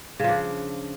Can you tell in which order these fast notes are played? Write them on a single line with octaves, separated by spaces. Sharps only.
C#3 F3 D4